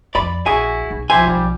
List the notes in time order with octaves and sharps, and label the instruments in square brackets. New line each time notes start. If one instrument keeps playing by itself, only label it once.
[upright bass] F2 [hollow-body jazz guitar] D5 B5
[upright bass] A#1 [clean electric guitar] E4 F#4 [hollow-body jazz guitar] G#4 G#5
[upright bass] B1
[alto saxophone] F3 [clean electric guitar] E4 G4 C5 [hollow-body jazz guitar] G#5
[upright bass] B1 [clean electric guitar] G3